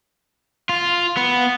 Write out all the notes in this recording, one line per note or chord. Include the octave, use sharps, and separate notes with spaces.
F4
B3